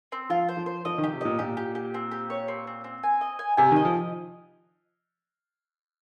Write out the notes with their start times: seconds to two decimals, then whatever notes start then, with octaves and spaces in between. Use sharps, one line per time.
0.12 C4
0.30 F3 F4
0.49 C5
0.57 F3
0.66 C5
0.85 F3 D#5
0.98 D#3
1.04 G4
1.13 C3
1.21 A#2 D#5
1.39 A#2 G4
1.57 G4
1.75 G4
1.94 C4
2.11 G4
2.30 C#5
2.48 C4
2.67 C4
2.84 C4
3.03 G#5
3.21 D#5
3.39 G#5
3.57 C3 G#5
3.71 D#3
3.76 D#5
3.85 F3